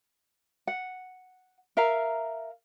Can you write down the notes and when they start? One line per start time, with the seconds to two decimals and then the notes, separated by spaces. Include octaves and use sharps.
0.67 F#5
1.77 A#4 E5 F5 A#5